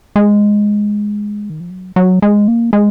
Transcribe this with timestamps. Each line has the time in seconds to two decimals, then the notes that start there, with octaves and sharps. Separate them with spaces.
0.16 G#3
1.50 D#3
1.60 F3
1.70 F#3
1.96 F#3
2.22 G#3
2.48 A#3
2.73 G#3